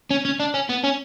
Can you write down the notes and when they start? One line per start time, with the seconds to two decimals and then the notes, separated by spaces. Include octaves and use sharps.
0.11 C#4
0.25 C#4
0.40 D4
0.54 C#4
0.69 B3
0.83 C#4